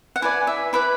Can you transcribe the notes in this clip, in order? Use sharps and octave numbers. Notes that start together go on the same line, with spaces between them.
F#5
E4 B4 D5 G#5
E5
E4 B4 D5 B5